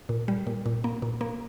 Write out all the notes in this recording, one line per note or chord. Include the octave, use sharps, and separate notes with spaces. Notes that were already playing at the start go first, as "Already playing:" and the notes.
A#2
G3
A#2
A#2
A#3
A#2
A#3